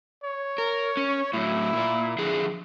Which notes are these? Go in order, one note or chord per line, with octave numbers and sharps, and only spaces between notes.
C#5
A#4
C#4
A2 F#3 E4
A#2 D5
D3 F3 G#4